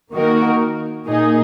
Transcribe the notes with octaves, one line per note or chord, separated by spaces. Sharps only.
D#3 A#3 D#4 F#4 A#4
A#2 A#3 D#4 G#4 D#5